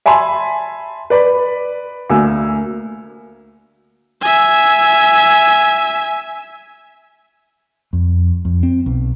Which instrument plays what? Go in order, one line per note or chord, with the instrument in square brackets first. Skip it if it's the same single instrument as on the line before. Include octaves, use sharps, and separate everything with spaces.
[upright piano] E5 G#5 A5 B5 C6
B4 D5 B5
D2 A#3 G#5 E6
[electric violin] E5 G#5
[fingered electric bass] F2
F2
C4
B1